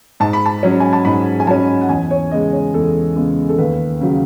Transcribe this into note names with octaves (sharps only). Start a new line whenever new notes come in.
G#2 A5
B5
A5
F#3 C#4
G#5
A5
G#2 B5
G#5
F#3 C#4 A5
F#5
E2 G#5
C#5
C#3 G#3 B3 D#5
C#5
E2 A4
C#3 G#3 B3
A4
D#2 B4
C#3 F#3